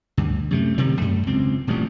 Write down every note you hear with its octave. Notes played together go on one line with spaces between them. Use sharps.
D2 G2
F#2 C3 A3
D1 C3 D#3 G3
F#2 A3
E1 C#2 C4
D#1 A1 F2 G3